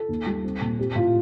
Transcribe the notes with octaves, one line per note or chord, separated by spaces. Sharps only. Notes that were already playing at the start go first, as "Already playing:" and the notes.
Already playing: A4
D#2
G3
C4
A#2
C4 G4
A2 F4